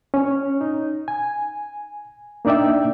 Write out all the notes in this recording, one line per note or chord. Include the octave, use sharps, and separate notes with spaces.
C#4 C#5
D#4
G#5
A#3 D4 D#4 D5 E5 G5